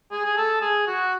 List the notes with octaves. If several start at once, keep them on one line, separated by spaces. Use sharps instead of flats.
G#4
G#4
A4
G#4
F#4